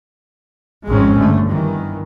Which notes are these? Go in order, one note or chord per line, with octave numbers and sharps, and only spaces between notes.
G#1 F2 G#2 G#3 C4 C#4
G1 D2 D3 A3
G2 D#3 E3